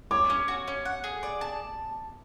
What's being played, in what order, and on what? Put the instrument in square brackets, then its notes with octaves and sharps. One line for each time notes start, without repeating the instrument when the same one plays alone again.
[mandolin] C#5 [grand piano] D6
[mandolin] C#4
F#4
C#4
F#5
G#4
D5
A5